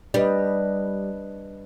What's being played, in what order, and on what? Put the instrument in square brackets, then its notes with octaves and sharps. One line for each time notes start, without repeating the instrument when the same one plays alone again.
[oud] G3 [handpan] D4 B4 D#5